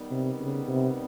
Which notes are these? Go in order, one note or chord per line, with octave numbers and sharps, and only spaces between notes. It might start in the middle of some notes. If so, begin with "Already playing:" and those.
Already playing: D#3 G3 B3
C3
C#3
C3